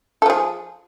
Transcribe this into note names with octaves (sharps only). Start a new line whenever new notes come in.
F3 G#4 A4